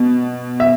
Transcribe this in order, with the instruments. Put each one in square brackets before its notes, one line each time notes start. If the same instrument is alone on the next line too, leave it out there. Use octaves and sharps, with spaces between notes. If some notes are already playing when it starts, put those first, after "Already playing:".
Already playing: [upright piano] B2
E5